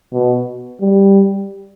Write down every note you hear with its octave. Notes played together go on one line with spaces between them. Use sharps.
B2
G3